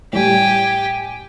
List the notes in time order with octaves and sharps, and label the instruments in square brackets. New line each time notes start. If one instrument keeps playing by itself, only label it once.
[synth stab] A2 G3 [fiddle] G4 [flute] G#5